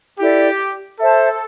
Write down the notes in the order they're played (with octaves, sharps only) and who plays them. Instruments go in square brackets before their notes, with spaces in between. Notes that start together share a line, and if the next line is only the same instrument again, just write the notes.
[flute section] E4 A4 D5 [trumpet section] G4
[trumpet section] A4 [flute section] C5 E5 A5